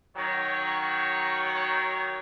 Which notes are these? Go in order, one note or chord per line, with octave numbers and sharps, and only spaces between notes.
D#3 F#3 C#5